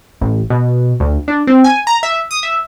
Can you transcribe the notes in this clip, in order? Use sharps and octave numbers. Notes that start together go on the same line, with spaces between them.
A1
B2
D2
D4
C4
G#5
A#5
E5
D#6
E5